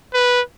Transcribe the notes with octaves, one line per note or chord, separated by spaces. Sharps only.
B4